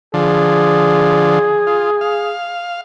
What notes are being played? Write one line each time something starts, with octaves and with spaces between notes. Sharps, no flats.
D3 F3 G#4
F4
F5